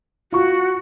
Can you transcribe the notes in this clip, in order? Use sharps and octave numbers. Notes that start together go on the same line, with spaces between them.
F4 F#4 C#6